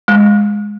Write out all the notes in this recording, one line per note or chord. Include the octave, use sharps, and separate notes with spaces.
G#3